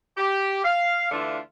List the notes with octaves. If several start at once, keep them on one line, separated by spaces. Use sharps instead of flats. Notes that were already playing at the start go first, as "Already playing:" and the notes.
G4
F5
D3 E3 A3 D4 F4